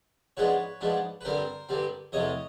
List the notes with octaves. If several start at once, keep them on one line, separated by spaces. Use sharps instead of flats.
G#2 F3 G#3 B3 D4 B4 C#5
G#2 F3 G#3 B3 D4
B4
G2 D3 G3 C4 A#4 C5
G2 D3 G3 C4
E2 C3 F3 A3 C#5 D#5